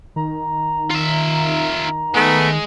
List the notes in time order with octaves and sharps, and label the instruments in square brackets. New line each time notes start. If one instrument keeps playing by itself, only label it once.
[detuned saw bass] D#3 [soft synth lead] A#5
[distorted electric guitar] F4 E5
[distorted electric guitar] G#3 [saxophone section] A3 B3